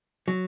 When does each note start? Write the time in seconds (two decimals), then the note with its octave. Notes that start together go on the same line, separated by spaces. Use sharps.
0.28 F#3